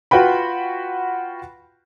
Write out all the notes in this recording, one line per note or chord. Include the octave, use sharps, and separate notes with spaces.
F4 F#4 B4 G5 B5